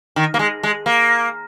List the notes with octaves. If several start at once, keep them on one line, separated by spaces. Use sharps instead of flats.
D#3
A#3
G#3
G#3
A#3